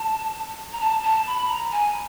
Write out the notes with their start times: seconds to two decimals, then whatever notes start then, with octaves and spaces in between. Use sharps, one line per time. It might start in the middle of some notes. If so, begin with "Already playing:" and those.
Already playing: A5
0.73 A#5
0.81 A5
1.03 A5
1.27 B5
1.49 A#5
1.72 G#5